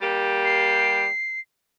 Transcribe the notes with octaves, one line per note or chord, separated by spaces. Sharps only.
G3 A#3 G4
C7